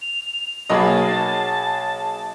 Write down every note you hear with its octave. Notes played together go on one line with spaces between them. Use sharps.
F7
B1 A#3 G#4 C#5 D#5 A5 B5